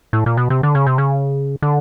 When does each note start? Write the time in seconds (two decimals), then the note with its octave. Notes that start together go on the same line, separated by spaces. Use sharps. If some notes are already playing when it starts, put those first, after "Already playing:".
0.13 A2
0.26 A#2
0.37 B2
0.50 C3
0.63 D3
0.75 C#3
0.87 C3
0.98 C#3
1.62 D3